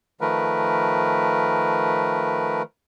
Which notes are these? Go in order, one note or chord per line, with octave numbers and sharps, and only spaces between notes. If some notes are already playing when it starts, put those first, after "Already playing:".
D#3 F3 A3 A#4 B4